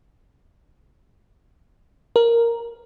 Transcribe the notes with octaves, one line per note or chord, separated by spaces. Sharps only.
A#4